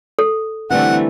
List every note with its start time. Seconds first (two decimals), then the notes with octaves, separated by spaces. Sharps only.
0.19 A4
0.70 D3 E3 G3 A3 C4 F#5